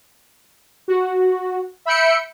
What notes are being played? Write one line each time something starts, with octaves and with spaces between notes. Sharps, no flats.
F#4
E5 B5 E6 G6 C#7 D7